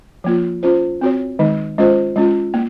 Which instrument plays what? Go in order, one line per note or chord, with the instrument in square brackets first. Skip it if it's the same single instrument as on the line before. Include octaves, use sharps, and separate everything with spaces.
[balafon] F3 A#3 F4
C#4 F4 C5
C4 F#4 C#5
D#3 G#3 D#4
G#3 C#4 F4 C5
G#3 C#4 F4
A#3